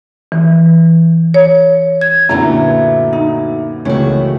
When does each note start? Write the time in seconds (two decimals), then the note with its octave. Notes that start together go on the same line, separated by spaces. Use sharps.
0.32 E3
1.34 C#5
2.01 G#6
2.29 F#2 A#2 D3 F#3 A3 B3 E4 A#5
3.13 D#4
3.85 C#2 D#3 E3 A3 F#4 C#5